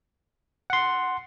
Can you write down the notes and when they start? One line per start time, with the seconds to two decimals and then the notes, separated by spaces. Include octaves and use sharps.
0.70 F#5 C6